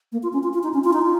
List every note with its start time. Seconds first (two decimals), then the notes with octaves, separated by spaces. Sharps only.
0.12 A#3
0.23 F4
0.33 C#4
0.43 F4
0.53 F4
0.63 D#4
0.74 C#4
0.84 F4
0.93 D#4
1.02 F4